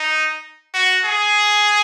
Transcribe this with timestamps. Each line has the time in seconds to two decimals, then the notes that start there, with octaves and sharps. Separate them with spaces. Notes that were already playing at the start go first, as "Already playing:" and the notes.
Already playing: D#4
0.74 F#4
1.05 G#4